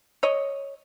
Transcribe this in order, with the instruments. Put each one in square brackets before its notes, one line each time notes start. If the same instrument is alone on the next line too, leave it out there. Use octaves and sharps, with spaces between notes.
[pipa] C#5 D#5